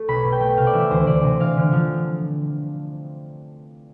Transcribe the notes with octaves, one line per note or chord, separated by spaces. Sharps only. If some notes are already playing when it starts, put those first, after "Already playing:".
Already playing: A3
B1 B5
B2
G5
A3
C3 F5
D5
E3 E5
D2 C5
D2 D5
C3
E3 F5
D3
F3